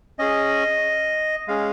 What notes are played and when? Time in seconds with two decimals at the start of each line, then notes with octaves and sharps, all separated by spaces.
0.19 C#4 G#4 D#5
1.47 G#3 C#4 G#4 F5